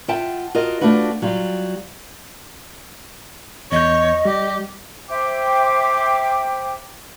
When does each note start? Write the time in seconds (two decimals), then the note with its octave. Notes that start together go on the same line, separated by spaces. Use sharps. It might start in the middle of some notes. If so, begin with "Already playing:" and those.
0.08 F4 E5 F#5 G5 A5
0.55 F4 F#4 A#4 D#5
0.81 A3 D4 F4 F#4 B4
1.22 F#3 G3 F4
3.72 E2 C#5 D#5 G6
4.25 G3 G4
5.09 C5 E5 G5 D6